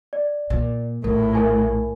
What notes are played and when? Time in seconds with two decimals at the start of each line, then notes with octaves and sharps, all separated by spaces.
0.13 D5
0.50 A#2
1.04 A#1 A2 A#4
1.35 A#4 G#5